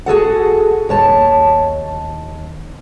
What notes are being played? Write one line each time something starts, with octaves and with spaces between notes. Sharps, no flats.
F#4 G#4 A4 F#5
D#2 C#5 A5